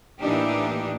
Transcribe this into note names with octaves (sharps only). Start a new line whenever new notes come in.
A2 E3 A#3 D4 D#4 G4